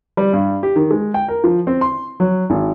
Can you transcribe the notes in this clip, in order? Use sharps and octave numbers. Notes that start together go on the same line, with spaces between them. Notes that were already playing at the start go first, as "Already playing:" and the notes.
G3
G2
G4
D#3
G#3
G5
A#4
F3
C4
C6
F#3
G#1